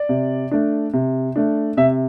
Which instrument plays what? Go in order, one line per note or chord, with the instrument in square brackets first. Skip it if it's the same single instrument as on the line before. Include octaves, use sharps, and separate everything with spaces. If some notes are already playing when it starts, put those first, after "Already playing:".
Already playing: [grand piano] D5
C3
A3 D4
C3
A3 D4
C3 E5